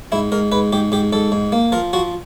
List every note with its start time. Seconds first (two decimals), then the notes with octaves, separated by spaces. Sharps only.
0.12 G#2 E4
0.32 G#2 A#4
0.52 G#2 B4
0.73 G#2 G4
0.92 G#2 G4
1.13 G#2 A4
1.32 G#2
1.52 A#3
1.72 F3 A#4
1.93 F3 F#4